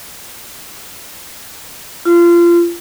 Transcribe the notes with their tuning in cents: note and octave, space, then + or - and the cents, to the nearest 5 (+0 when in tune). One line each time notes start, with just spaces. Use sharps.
F4 -25